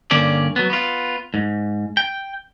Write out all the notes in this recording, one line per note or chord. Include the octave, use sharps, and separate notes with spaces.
G2 D3 A#3 C#4 D5
F#3 B3
B3 F4
G#2
G5